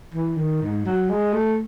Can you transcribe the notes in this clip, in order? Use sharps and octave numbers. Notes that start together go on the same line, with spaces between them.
E3
D#3
G#2
F#3
G#3
A3